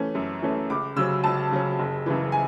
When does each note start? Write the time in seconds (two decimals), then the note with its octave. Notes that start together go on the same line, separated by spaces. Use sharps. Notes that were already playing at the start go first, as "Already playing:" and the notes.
Already playing: E3 A3 C#4
0.15 F#2
0.42 E3 A3 C#4
0.70 C#2 D6
0.96 C#3 F#3 C#4 E6
1.24 C#2 A5
1.51 C#3 F#3 C#4
1.79 F#1
2.06 F#2 C#3 E3
2.32 G#5